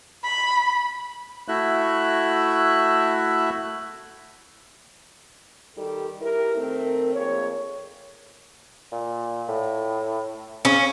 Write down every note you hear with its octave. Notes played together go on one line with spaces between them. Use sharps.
B5
A3 E4 F#4 E5 F#6
D#3 G3 G4 A4
E4 G4 A#4
D#3 A3 C4 A#4
F2 A#3 G#4 C#5
A#2
A2
C#3 C#4